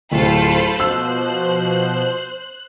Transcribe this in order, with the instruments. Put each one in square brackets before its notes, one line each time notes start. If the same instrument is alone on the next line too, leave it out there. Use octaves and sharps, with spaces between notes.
[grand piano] D1 [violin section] F4 A4 B5 [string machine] C5
[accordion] B2 F3 [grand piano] E6 [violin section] F#6